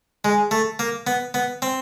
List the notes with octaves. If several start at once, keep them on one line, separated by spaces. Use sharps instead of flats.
G#3
A3
A#3
B3
B3
C4